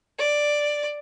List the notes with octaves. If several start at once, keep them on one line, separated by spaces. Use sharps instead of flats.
D5